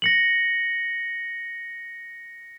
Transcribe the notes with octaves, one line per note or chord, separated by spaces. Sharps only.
A#6 C#7 F#7